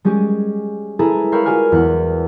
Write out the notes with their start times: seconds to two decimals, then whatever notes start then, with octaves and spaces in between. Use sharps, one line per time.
0.05 G3 G#3 C#4 G4 G#4
0.99 E4 G#4 A4 B4 G#5 A#5
1.32 A#4 C#5 F5 G5 B5 E6
1.45 F4 F#4 G#4 D5 G#5 F6
1.72 E2 F#5